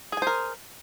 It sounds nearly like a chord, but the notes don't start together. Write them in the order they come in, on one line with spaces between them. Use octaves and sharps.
G#4 G#5 C5 A#4